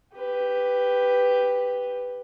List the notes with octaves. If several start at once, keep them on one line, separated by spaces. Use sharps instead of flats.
G4 B4